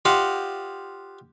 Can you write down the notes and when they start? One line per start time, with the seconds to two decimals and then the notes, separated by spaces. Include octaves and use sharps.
0.05 F4 G4 C5 D#5 F5 F#5